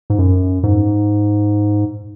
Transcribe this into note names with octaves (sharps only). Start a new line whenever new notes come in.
G#2
F#2
G#2